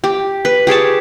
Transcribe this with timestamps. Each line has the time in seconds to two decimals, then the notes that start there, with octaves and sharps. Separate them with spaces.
0.04 G4
0.45 B4
0.67 G4 G#4 C#5 A5